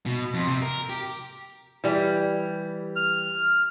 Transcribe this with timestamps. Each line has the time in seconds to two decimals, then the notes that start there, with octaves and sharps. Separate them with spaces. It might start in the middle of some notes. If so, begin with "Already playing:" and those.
0.06 B2
0.34 F2
0.47 C3
0.62 A#4
0.89 G4
1.84 E3 G3
2.96 F6